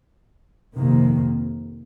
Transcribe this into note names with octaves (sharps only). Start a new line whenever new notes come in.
F2 C3 D#3 A#3